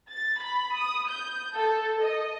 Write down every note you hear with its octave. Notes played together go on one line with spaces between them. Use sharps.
A6
B5
D#6
G6
A4
D#5